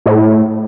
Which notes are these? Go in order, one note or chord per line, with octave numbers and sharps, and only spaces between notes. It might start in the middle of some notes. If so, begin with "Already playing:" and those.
A2